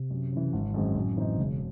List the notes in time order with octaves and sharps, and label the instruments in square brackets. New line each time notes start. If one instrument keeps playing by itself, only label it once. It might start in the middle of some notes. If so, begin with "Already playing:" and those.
Already playing: [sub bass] C3
[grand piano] F#2
C#3 E3
[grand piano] G#1 [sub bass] G#2
[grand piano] F#2 D#3 G#3 C4
[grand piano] F#2 [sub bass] A2
[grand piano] C#3 E3 C4 D#4
[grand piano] E1 [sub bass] C#3